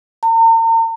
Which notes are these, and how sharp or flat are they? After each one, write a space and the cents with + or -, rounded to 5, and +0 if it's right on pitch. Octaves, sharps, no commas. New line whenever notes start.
A#5 -40